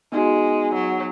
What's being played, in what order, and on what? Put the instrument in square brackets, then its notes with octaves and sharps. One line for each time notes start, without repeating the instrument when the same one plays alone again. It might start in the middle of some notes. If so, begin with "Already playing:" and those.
[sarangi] G#3 [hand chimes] B3 D#4 F#4
[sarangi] F#3